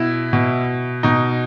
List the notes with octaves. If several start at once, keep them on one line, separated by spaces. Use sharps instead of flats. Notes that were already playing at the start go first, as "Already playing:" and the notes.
Already playing: B2 E4
B2
B2 D#4